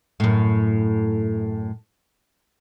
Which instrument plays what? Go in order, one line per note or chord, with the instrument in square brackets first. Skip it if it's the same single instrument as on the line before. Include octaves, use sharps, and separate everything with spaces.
[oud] F#2 A2